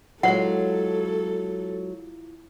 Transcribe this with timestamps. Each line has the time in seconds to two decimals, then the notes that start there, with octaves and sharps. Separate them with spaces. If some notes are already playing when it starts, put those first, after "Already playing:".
0.23 F#3 G#3 E4 F4 A4 C#5 F#5